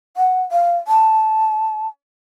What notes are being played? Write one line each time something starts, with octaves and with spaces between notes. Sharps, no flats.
F#5
F5
A5